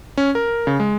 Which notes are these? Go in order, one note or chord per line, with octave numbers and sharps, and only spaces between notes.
C#4
A#4
C#3
G#3